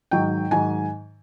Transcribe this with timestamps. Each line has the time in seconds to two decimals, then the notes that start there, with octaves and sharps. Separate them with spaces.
0.11 G#2 D#3 F#3 G5
0.51 G#2 D#3 F#3 G#5